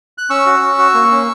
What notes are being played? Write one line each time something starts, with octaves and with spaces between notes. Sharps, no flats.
F#6
C#4 C#6 E6
F#4
C#4
F#4
A#3
C#4